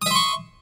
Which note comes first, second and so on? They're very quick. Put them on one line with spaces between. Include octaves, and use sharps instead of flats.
D#6 E5 C6 C#6